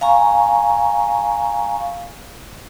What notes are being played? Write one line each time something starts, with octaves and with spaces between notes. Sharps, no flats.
F5 G#5 A#5 C#6